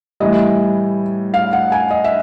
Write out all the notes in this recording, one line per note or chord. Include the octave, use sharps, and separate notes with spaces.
A2 E3 G3 D#5
F5
F#5
G#5
D#5
E5